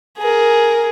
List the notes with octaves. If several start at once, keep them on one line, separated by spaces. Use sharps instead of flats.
G#4 A#4